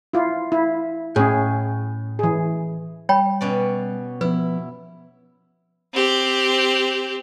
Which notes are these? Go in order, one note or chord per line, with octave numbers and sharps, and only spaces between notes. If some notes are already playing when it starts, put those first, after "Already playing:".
E4 F4
E4
A2 C#4 G#4
E3 G#4
G3 C#5 G5 B5
B2 C#4 D5
F3 B3 E4 B4
C4 G4